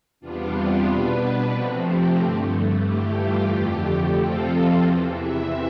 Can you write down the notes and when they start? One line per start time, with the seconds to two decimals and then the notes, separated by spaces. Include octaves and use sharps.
0.20 E2 C3 G3 B3 D4 F4
0.53 G4
0.85 B2 B3 D4 B4
1.18 B4
1.50 C3 F3 A3 C4
1.83 G4
2.16 G2 D3 A3
2.81 G2 E3 A3 G4
3.14 F4
3.46 F2 D3 A3 G4
4.11 C3 F3 C4 F4 A4
4.77 E2 C3 E3
5.09 E5